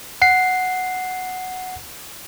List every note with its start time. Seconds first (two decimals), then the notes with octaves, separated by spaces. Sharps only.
0.22 F#5 C7